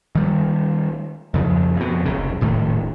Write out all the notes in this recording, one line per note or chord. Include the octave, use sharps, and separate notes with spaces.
D#3 G3
F2 C#3 F3
F2 B2
F1 B1 C#3
D#1 A2 D#3 A3